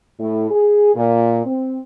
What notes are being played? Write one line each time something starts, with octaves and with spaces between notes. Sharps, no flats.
A2
G#4
A#2
C4